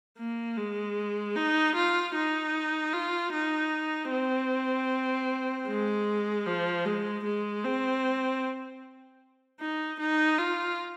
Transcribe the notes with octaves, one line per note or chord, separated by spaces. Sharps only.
A#3
G#3
D#4
F4
D#4
F4
D#4
C4
G#3
F3
G#3
G#3
C4
D#4
D#4
F4